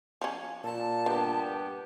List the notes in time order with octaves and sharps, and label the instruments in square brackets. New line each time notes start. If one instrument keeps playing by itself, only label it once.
[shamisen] F3 C#4
[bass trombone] A#2 [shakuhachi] A5
[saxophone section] G2 B3 G4 [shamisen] D3